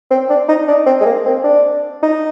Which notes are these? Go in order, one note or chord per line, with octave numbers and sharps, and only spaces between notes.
C4
D4
D#4
D4
C4
G#3
A#3
C4
D4
D#4